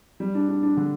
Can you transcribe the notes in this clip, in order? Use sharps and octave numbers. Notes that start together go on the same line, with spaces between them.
G3
D4
D4
D4
D3